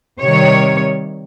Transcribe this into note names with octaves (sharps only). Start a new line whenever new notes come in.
C3 D#3 G3 C#5